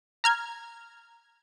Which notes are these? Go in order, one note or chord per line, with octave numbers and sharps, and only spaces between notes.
A#5 F6 G#6